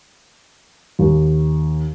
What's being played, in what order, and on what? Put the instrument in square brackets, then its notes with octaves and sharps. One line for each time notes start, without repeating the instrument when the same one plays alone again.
[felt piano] D#2